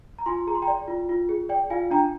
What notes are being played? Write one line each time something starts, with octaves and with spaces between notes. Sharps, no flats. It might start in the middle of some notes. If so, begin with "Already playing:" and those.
A#5
F4 G#5 C6
G#4 A#5
C6
G5 A#5
D5
F4
F4
G#4
D5 G5
F4 F5 G#5
D4 G5 A#5